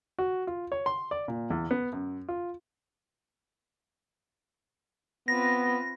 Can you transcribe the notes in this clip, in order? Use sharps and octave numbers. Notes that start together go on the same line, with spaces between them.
F#4
F4
C#5
C6
D5
A#2
E2
B3
F#2
F4
B3 C4 F4 B4 A#6